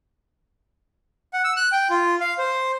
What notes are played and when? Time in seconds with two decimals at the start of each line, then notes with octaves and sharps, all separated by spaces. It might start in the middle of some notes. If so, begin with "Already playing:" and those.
1.33 F#5
1.44 E6
1.57 F#6
1.72 G5
1.90 F4
2.21 F5
2.38 C5